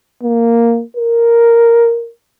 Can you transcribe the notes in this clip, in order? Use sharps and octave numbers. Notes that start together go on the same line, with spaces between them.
A#3
A#4